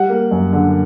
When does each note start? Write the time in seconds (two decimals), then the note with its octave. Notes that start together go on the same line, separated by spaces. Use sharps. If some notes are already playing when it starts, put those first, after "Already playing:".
Already playing: G3 F#5
0.10 A#3
0.31 F#2
0.53 D3